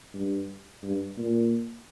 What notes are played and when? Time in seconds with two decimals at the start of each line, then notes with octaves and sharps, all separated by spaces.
0.14 G2
0.83 G2
1.17 A#2